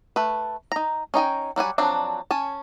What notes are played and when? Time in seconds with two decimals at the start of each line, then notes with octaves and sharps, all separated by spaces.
0.16 A3 B4
0.72 D#4 A#5
1.14 C#4 D#4 G5 G#5
1.56 F#3 G3 F#5 G#5
1.78 F3 F#3 C4 D4
2.31 C#4 G#5 A5